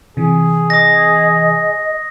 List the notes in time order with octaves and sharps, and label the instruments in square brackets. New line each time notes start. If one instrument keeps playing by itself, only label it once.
[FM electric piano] C3 E3 [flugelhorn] G#4
[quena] D#5 [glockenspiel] D#6 A#6